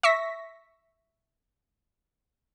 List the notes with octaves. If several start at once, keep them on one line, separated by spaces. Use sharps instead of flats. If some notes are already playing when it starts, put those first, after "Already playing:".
E5 C#6 A#6 B6